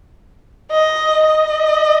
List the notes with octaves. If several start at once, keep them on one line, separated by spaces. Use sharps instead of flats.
D#5
D#5